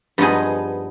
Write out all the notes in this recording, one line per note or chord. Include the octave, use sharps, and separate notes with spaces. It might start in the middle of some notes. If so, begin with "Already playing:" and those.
G2 F3 B3 D#4 G#4